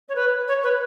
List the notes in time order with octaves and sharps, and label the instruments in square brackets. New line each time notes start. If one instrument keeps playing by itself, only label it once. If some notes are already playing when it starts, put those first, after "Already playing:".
[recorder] C#5
B4
C#5
B4